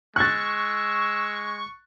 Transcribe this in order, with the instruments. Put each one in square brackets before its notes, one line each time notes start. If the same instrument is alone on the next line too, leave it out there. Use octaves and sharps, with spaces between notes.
[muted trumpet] G#3 [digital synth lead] C#6 [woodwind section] E6 [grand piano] F#6 A6